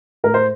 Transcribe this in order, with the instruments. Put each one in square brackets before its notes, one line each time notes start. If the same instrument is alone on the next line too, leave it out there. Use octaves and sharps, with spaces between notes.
[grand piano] A2 A#4
C5